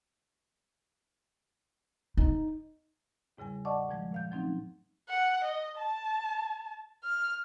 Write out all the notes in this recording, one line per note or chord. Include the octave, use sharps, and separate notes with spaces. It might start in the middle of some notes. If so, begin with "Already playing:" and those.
D#4
E2 G#2 C#3 G3 G#5
D5 D#5 F#5 A5 C#6 D6
A#2 D#3 F3 G#3
A#2 F5 G6
F3 F#3 A3 C4 C#4 D#4
F#5
D#5
A5
F6